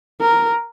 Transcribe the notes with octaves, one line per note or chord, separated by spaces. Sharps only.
A#4